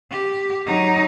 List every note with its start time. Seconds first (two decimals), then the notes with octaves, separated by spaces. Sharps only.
0.11 G4
0.66 F#3 D#4